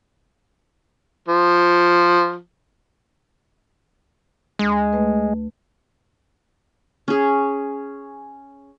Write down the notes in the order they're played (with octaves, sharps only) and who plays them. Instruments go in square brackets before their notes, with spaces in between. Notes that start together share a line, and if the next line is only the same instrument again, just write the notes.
[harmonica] F3
[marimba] D2 [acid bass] G#3
[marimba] A3 B4
[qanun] C#4 G#4